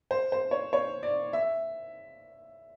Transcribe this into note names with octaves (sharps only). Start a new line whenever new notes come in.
C5
C5
C#5
C#5
D5
E5